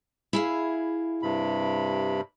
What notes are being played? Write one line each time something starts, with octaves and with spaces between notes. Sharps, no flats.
E4 G#4 F5
G2 C3 B5